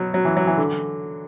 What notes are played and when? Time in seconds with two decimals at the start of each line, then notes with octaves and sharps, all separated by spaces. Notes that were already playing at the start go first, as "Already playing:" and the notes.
Already playing: B2 F#3
0.14 F#3
0.25 E3
0.37 F#3
0.47 E3
0.58 D3